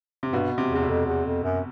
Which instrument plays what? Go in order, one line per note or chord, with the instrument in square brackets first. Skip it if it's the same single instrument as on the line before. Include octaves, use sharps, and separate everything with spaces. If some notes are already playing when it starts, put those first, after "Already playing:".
[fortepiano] C3
[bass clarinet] G2 [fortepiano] B2
[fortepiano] C3
[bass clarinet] E2
[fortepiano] C3
B2
[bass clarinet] F2
E2
F2
F#2